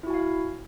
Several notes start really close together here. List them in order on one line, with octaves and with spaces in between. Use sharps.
E4 F#4 G#5 F5